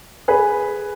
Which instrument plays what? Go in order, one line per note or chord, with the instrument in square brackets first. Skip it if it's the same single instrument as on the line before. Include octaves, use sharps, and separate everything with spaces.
[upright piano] G#4 B4